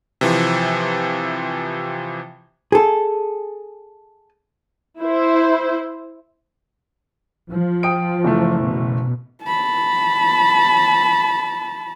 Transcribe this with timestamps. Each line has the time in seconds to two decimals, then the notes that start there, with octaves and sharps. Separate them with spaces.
0.21 C3 E3 F3
2.72 G#4 A4
4.99 E4 C5
7.49 F3
7.83 G5 D#6 D7
8.24 F#1 E3 A3
8.65 B2
9.44 A5 B5